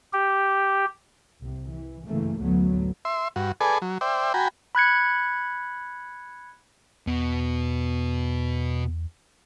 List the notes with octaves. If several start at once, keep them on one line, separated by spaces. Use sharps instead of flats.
G4
C2 C3
E3
G2 C#3 E3 A3 A#3
A1 D2 F#3 A3 B3
E5 C6
G2 F#4
G#4 A4 B4 D5 G#5
F#3
C5 D5 E5 G5
F#4 G5 G#5 A#5 B5
B5 F#6 G#6 C#7
E2 B2 B3